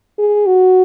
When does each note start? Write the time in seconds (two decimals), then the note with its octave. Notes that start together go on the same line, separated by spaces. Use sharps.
0.19 G#4
0.46 F#4